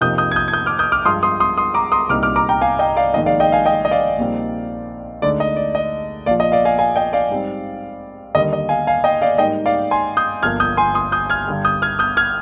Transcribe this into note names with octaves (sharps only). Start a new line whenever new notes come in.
F2 C3 F3 A#3 D#4 D#6 G6
D#6 G6
G#6
D#6 G6
G#6
D#6 G6
D6 F6
D#6 G6
D6 F6
G2 F3 G#3 C6 D#6
C6 D#6
C6 D#6
C6 D#6
A#5 D6
C6 D#6
C2 A#2 G3 C4 D#4 D6 F6
D6 F6
A#5 D6
G5 A#5
F5 G#5
D#5 G5
D5 F5
A#1 G#2 D#3 G#3 D#4 D#5
D5 F5
D#5 G5
F5 G#5
D#5 G5
D#5
D5 F5
A#1 A#2 G3 C4 D#4
D2 D3 G#3 D#4 D5
D#5
D5
D#5
A#1 A#2 F3 D5 F5
D#5
D5 F5
F5 G#5
F5 G#5
D#5 G5
D5 F5
G#2 G3 C4
D#2 D3 G3 A#3 D#5
D#5
F5 G#5
F5 G#5
D#5 G5
D5 F5
G#2 G3 A#3 D#4 D#5 G5
D5 F5
G#5 C6
D#6 G6
G1 G2 D3 F3 A#3 F6 G#6
D#6 G6
G#5 C6
C6 D#6
D#6 G6
F6 G#6
G2 D3 G3
D#6 G6
F6 G#6
D#6 G6
F6 G#6